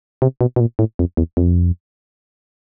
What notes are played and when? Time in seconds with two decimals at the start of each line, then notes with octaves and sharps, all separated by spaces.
0.22 C3
0.41 B2
0.56 B2
0.60 A#2
0.79 A2
0.99 F2
1.17 E2
1.37 F2